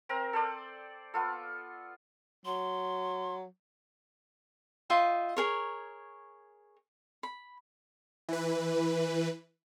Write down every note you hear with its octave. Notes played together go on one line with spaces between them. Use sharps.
C4 A#4 A#5
A4 C5 D5
B3 F4 A4
F#3 C6
F4 D#5 E5 G5
G#4 A#4 C#5
B5
E3 B4